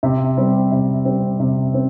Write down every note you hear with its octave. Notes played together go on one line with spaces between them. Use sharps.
C3
G3 C4
C3
G3 C4
C3
C4